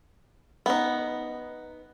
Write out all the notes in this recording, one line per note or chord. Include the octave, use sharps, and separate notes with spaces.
B3 D#4